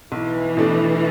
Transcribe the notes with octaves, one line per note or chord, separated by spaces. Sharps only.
B1 E3
B2 A3 D4